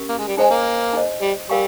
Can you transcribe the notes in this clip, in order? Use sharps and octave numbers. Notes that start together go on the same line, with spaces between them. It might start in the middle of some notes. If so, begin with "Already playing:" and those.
Already playing: C#4 G4 A#4
A#3
G#3
G3
G#3 D#4 G#4 C5 D#5 G#5
A#3
D#4 G#4 C5 D#5
G3
G3 A#4 F5 G#5 C#6